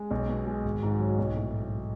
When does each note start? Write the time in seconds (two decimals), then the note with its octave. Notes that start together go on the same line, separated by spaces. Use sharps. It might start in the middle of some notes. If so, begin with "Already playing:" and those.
Already playing: G#3
0.11 B1
0.29 B2
0.47 G#3
0.65 G#1
0.83 G#2
1.00 F#3
1.18 B1
1.36 A2